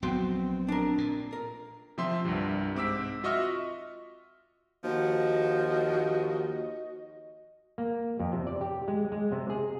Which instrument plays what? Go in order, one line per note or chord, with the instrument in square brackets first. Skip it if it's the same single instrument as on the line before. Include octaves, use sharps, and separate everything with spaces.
[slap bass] A#1 F#3 B3 [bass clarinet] C4 [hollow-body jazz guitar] F#4 G5 C6
[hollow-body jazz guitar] D4 A#4
[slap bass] A#2
[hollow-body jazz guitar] A#4
[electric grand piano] C3 F3 C4 E5 C6
C2 G2 C3
G#2 C4 D6 E6 B6
F4 F#4 D#5 E5 C#6 F6
[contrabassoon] D#2 [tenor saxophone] F3 [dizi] F#4 [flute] D#5
[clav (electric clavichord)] A#3
F2
C3
D5
G4
G#3
G#3
C3
G#4